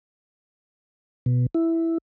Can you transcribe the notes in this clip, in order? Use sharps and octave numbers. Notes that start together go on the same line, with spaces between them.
B2
E4